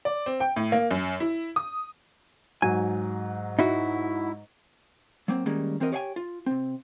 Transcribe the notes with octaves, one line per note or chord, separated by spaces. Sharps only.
D5
C4
G5
A2
A#3
F#2
E4
D#6
G#2 F#3 G#5
D#4 E4 F#4
F#3 A#3 C4
D#3 G3 G#3 A#3 C#4
E3 C4 F#4 A#4 D#5
G4 C#5 D5 F5 G5 G#5
F4
C3 C4